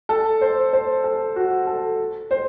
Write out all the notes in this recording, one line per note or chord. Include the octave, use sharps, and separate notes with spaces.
A4
C5
C5
A4
F#4
A4
C5